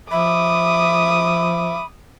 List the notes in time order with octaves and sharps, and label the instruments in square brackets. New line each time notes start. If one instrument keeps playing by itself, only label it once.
[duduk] F3 [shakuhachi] E5 [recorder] B5 [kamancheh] D6 D#6